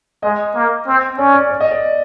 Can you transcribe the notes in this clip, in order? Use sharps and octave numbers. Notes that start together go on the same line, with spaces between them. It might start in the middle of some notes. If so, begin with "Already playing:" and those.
G#3 D#5
A#3
C4
C#4 D5
D5
D5
D#5
D5